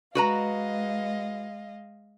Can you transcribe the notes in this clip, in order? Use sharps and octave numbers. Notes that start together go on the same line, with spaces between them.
G#3 F#4 B4 D#5 F5 A#5